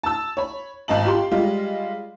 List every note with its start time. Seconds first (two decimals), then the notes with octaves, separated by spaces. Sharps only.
0.03 A5 E6
0.37 C#5 B5
0.88 G#1 C4 D#5 A5 F#7
1.05 F4 G4 C6
1.31 G3 G#3 F4